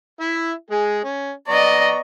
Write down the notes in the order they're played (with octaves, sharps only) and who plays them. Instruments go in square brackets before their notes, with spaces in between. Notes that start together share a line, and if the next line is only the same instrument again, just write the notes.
[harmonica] E4 E5
G#3 G#4
C#4
[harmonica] B3 A#5 C#6 [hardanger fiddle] D5 D#5